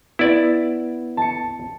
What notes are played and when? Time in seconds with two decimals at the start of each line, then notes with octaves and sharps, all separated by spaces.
0.19 B3 E4 D5
1.17 A5 C#7